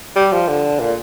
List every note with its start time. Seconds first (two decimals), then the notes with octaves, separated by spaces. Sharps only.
0.16 G3
0.32 F3
0.48 D3
0.79 A#2